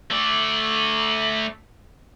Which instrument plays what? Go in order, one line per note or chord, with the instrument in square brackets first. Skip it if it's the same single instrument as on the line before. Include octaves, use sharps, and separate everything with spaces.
[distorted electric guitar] A3 D5